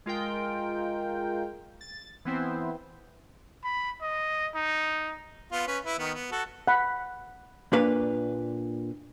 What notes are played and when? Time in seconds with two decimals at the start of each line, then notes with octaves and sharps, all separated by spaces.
0.06 G#3 F4 A#4 G5
1.81 A6
2.25 E3 B3 C4 E4 C5
3.64 B5
4.02 D#5
4.55 D#4
5.52 B3 F4
5.67 C#4 B4
5.85 E4 B4
5.99 D#3 B3
6.14 B3
6.32 F#4 A4
6.68 F#5 B5
7.73 A#2 D4 B4 F5